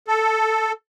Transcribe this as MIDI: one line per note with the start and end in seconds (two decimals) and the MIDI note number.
0.08 0.72 69